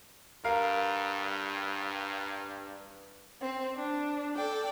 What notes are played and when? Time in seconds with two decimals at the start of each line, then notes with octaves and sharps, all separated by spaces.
0.44 G2 A#4 F5
3.41 C4
3.76 D4
4.36 A4 D5 G5